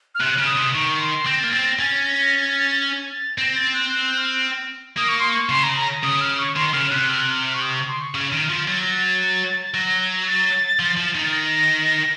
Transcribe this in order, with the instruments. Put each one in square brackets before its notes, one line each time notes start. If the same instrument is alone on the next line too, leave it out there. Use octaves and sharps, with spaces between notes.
[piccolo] F6
[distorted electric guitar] C3 [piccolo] F#6
[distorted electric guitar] C#3 [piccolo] F6
[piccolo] D#6
[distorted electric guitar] C3
[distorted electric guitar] D#3 [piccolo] C#6
[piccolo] C6
[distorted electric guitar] C4 [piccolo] A#6
[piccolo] A6
[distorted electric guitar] A#3
[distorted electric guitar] C4 [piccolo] A6
[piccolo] A#6
[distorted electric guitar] C#4 [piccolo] A6
[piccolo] A#6
A6
A#6
A6
A6
A6
A6
[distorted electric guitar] C4 [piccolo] A#6
[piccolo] A6
F#6
F#6
F#6
F6
[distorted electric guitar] A#3 [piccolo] D#6
[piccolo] C#6
C6
C#6
[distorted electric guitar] C#3 [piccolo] C6
[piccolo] A#5
A#5
[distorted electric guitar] C#3 [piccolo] D#6
[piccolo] F6
C#6
[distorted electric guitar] D#3 [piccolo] C6
[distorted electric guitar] C#3 [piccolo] F6
[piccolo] F6
[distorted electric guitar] C3 [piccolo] F#6
[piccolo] F6
F#6
F6
C#6
D#6
C#6
C6
C#6
[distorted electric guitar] C#3 [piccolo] F6
[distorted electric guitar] D#3
F3
[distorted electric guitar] F#3 [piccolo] A6
[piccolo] A#6
A6
A6
[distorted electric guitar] F#3 [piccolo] A#6
[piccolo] A#6
A6
[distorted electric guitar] F3
F3
D#3
[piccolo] A6
A#6